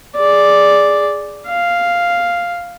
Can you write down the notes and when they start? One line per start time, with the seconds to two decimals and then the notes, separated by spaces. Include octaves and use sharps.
0.16 G#4 D5
1.48 F5